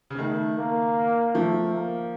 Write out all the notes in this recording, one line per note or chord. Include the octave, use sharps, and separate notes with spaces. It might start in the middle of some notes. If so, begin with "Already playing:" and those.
C#3
D#3 A3
A#3
F3 A3
A#3